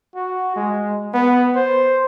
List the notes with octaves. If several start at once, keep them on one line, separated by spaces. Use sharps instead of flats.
F#4
G#3
B3
C5